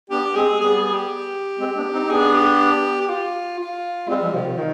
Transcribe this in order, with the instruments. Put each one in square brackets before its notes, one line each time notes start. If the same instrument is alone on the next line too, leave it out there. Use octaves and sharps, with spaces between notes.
[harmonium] B3 D4 [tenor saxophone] G4
[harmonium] G#3 C4 [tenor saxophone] G#4
[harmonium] G3 B3 [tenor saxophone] G#4
[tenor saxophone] G#4
G4
[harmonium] G#3 C4
B3 D4
C4 D#4
D#4
[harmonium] B3 D4 [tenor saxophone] G#4
[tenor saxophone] G4
G4
F4
F4
[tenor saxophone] G3 [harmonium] G#3 C4
[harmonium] F3 G#3
[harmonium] C3 D#3 [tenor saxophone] F3
[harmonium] C3 D#3
[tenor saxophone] D#3